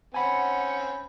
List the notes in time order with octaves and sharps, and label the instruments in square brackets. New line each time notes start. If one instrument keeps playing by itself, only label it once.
[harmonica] C4 C#4 [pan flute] F#5 [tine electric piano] G#5 B5